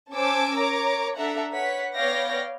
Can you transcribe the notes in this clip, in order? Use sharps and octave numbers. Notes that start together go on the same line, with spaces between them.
C#4 C5 G#5 A5 D6 E6
A#4 C#5 A#5 D6
D4 A4 E5 F#5 A#5
B4 C#5 F#5 B6
B3 C#5 D5 F5 G5 A#6